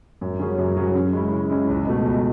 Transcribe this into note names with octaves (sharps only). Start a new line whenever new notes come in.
F#2
C#3 F#3 C#4 G#4
F#2
C#3 F#3 C#4 G#4
C#3
G#3 C#4 E4
C#3
G#3 C#4 E4
C#2
B2 A3
C#2